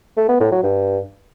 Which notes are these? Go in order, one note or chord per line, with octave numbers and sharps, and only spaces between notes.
A3
B3
A2
F#3
G2